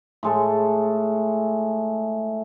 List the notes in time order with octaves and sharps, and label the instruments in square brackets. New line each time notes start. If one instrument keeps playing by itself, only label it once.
[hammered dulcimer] A2 G#3 A4